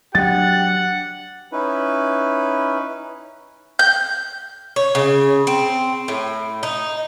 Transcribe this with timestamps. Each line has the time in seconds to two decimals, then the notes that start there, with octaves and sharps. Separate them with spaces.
0.15 F#3 D4 G4 F#5 A6
1.52 C#4 D#4 E4 B4
3.79 G6
4.76 C#5
4.95 C#3
5.47 C4
6.08 A2
6.63 D#4